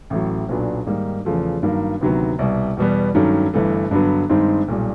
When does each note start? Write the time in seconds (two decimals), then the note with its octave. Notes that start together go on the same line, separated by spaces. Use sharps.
0.10 A1 A2 F#3
0.48 B1 A#2 F#3 B3 D4
0.86 G#2 D#3 G3 A#3 D#4
1.25 E2 C#3 F3 A3
1.63 G2 D#3 F#3 A#3
2.01 D2 C3 D#3 F#3 B3
2.39 C2 B2 G3
2.77 E2 B2 G3 B3
3.15 G2 D#3 F#3 A3 C#4
3.54 G1 G2 E3 A3
3.91 G2 D3 F#3 B3
4.29 G2 D#3 G#3 C4 D#4
4.68 B1 A#2 G3